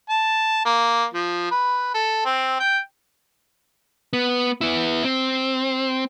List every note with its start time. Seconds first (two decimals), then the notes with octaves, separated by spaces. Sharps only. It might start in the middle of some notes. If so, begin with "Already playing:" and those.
0.10 A5
0.65 A#3
1.14 F3
1.51 B4
1.94 A4
2.26 C4
2.60 G5
4.13 B3
4.61 B3 E4
5.04 C4